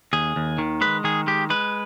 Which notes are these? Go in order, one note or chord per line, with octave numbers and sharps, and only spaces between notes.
D#2 G#4
D#2
D#3
G#3 B4
D#3 G#4
G#3 G4
G#3 B4